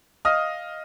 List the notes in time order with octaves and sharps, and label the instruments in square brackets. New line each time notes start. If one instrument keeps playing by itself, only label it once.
[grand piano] D#5 F5 D#6 F6